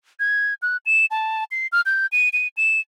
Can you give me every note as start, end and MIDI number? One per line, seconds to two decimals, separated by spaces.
0.20 0.54 92
0.62 0.77 90
0.86 1.06 100
1.11 1.44 81
1.51 1.67 96
1.72 1.81 89
1.86 2.06 91
2.12 2.29 99
2.33 2.48 99
2.57 2.80 100